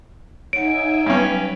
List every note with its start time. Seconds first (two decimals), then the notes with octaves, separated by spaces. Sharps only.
0.53 D#4 C#5 E5 F#5 G#5 D7
1.06 G2 F#3 C#4 B4